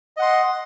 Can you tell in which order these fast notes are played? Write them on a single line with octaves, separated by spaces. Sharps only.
D#5 F#5 C6